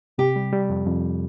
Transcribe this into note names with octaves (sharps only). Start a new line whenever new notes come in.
C3 G4
G3
G3
F2
F2